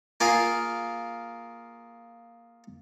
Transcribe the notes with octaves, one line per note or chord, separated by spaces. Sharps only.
A#3 F4 G#4